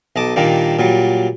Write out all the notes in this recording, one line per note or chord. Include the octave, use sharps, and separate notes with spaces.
B1 D#5 A5 D6
A#2 D#3 G3 A#3 D4
A#2 F#3 G3